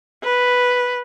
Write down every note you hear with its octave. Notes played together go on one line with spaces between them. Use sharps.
B4